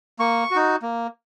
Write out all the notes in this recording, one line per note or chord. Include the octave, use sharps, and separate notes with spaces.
A#3 C#6
D#4 F#4
A#3